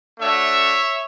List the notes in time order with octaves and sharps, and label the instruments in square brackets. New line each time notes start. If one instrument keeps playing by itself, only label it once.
[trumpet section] A3 D4 F#4 C#5 E5